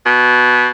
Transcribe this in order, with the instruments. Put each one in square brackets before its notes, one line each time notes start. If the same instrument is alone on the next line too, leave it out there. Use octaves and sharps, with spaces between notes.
[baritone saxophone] B2